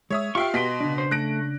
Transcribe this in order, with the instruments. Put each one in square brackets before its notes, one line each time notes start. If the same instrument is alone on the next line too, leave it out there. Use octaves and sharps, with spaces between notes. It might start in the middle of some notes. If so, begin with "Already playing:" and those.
[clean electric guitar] G#3 [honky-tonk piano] C#5 E5 D#6
[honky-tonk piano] F4 E5 F5 [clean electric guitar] G4 [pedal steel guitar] G5 C#6
[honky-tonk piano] B2 B6 D7 [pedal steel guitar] D#5 C6
[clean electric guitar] C#3 D4
[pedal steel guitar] C5
[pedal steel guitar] A3 [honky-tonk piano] F#6 A#6 D7